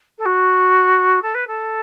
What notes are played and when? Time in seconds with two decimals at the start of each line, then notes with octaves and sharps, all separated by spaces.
0.18 A4
0.25 F#4
1.22 A4
1.34 B4
1.47 A4